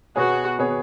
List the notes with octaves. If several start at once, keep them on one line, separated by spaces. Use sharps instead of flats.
B2 B3 F#4 G#4 C#5
B2 B3 G#4 C#5